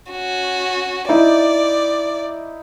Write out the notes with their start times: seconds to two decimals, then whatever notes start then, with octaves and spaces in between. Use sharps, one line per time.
0.12 C#4 F#4
1.09 D#4 E4 D5